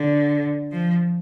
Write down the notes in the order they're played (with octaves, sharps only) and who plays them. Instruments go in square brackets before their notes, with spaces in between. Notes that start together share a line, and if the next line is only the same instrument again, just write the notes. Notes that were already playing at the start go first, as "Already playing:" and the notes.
Already playing: [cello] D3
F3